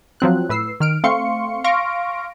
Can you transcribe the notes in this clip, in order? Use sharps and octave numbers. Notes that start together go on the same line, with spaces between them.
F3 F#3 C4 F#6
A2 B4 E6 C7
D#3 F6 D7
A3 C4 F5 C6 C#6 C#7
F5 C6 C#6 F6 A#6 D7